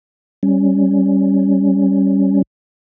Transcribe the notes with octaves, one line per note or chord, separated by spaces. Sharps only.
G3 C#4